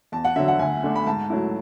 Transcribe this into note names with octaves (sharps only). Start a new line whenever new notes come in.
E2 A5
F#5
D3 F#3 E5
F#5
D2 G#5
D3 A3 D4
B5
G#2 A5
F#3 A3 E4